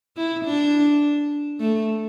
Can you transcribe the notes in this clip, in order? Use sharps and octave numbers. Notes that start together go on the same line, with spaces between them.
E4
D4
A3